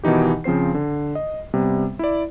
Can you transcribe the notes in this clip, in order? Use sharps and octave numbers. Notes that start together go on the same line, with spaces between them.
B2 D#3 E3 D#4 G4
C#3 F3 C4 C5 C7
D3
D#5
C3 G3 B3
E4 D5